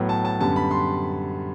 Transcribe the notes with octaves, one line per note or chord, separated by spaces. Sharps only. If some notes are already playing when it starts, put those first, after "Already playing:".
Already playing: A2 F#3 B3
A5
A5
F#2 D3 G3 B3 A5
B5
C6